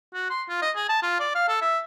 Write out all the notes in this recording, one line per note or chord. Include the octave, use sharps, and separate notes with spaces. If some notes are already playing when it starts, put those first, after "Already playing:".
F#4
C6
F4
D#5
G#4
A5
F4
D5
F5
A4
E5